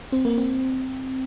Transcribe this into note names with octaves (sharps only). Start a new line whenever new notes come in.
C4
A#3
C4